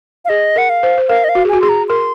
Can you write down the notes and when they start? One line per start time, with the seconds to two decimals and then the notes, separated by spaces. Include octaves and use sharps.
0.25 F5
0.29 G#4 D#5
0.56 A#4 F#5
0.70 F5
0.83 C5
0.98 C5
1.09 A#4 F5
1.24 D#5
1.29 F5
1.35 F#4
1.45 G#4
1.49 F#4 G#5
1.61 G#4 C6
1.69 A#5
1.89 A#4 C6